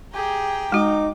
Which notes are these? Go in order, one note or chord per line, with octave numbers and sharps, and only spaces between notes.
G4 G#4 G5 A#5
G#3 D#4 F#4 D6